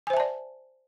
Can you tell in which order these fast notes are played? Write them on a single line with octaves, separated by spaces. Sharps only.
G#5 C5 E5 A5 D5